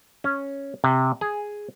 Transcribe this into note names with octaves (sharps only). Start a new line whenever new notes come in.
C#4
C3
G#4